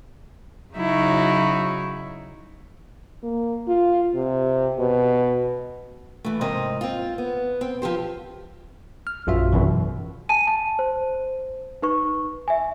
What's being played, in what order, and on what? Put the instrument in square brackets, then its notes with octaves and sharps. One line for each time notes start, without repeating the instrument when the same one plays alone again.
[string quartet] C#3 F#3 D#4 E4 F#4
[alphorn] A#3
F4
C3
B2
[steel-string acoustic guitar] E3 A3
G#2 C3 C4 A#4 D#5
C4 F4
B3
C4
F3 C4 G4 C5
[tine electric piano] F6
A#1 F#2 F4 F#4 E5
G#1 F#2 B2 E3
[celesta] G#5 A5 D#7
A5
C5
D#4 B4 C#6
E5 G#5